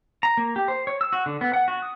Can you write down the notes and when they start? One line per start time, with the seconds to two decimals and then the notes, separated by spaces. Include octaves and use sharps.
0.23 A#5
0.37 A#3
0.56 G4
0.68 C5
0.87 C#5
1.01 E6
1.13 F#4
1.26 D3
1.41 B3
1.53 F#5
1.68 F#4
1.82 D#6